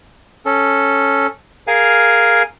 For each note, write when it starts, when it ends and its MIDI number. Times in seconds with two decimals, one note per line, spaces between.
0.46 1.27 61
0.46 1.27 69
1.67 2.42 68
1.67 2.42 70
1.67 2.42 77
1.67 2.42 80